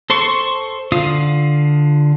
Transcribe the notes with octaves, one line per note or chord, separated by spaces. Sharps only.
A4 C5 C6 C#6
D3 F4 F5 D#6